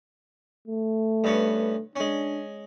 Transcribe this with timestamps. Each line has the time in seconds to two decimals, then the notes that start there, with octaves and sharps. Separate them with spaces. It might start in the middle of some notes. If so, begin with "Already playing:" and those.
0.68 A3
1.24 G2 B3 C#4
1.96 G#3 C#4 D4